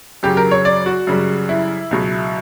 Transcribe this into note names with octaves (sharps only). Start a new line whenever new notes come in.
F#2 C#3 F#3 G4
A#4
C#5
D5
F#4
F#2 C#3 G3
E4
C#2 B2 F#3